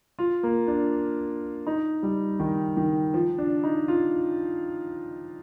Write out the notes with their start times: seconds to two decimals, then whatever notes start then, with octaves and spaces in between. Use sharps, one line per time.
0.19 F4
0.43 A#3
0.68 D4
1.67 D#4
2.03 G3
2.40 D#3
2.77 D#3
3.14 F3
3.38 D4
3.64 D#4
3.88 F4